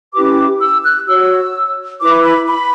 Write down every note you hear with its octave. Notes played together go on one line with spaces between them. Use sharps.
C#4 E4 G4 B4 D6
E6
F#6
F#4 C#5 E6
E4 B4 D6
B5
B5